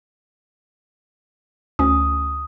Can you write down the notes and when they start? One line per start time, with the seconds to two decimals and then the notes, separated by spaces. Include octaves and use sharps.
1.79 D2 C#4 D#6